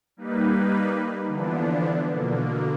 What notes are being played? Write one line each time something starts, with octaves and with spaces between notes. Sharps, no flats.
G3 A#3 D#4 B4
D3 E3 F3 B3 D4
B2 D3 A#3